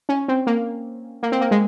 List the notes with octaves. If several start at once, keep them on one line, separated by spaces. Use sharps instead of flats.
C#4
C4
A#3
A#3
C4
A#3
G#3